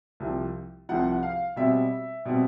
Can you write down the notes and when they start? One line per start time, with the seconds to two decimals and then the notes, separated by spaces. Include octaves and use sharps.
0.20 C2 C3 F3
0.89 C2 C3 F3 F#5
1.12 F#5
1.23 F5
1.56 B2 G3 C4 E5
2.25 B2 G3 C4